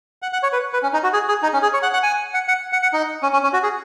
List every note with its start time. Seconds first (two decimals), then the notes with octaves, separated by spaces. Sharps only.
0.22 F#5
0.33 F#5
0.43 C#5
0.53 B4
0.73 B4
0.83 C#4
0.93 D#4
1.03 F#4
1.13 G#4
1.29 G#4
1.43 D#4
1.53 C#4
1.63 G#4
1.74 C#5
1.83 F#5
1.93 F#5
2.03 G#5
2.34 F#5
2.48 F#5
2.73 F#5
2.83 F#5
2.93 D#4
3.23 C#4
3.33 C#4
3.43 C#4
3.53 F#4
3.63 G#4